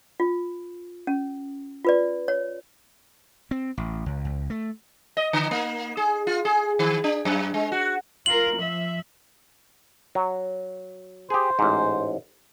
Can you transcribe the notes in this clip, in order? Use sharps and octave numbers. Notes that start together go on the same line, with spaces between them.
F4
C#4
F4 B4 D5
C#5
C4
A1
C#2
C#2
A3
D#5
D3
A#3
G#4
F4
G#4
D#3
D4
F#2
G#3
F#4
F4 A#4 F#7
F3 E5
F#3
G4 G#4 C5
A1 G#2